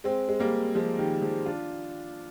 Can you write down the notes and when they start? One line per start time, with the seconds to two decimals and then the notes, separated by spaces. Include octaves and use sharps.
0.04 G#3 C4
0.29 G#3
0.40 G3 A#3
0.75 F3 G#3
0.99 D#3 G3
1.22 F3 G#3
1.45 D4 F4